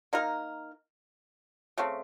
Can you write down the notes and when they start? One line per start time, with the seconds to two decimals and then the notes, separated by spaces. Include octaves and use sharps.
0.13 A#3 D#4 A#4
1.78 C#3 A3 C4